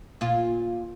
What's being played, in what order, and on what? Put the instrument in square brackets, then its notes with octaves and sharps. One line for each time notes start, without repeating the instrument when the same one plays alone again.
[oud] A#2 F4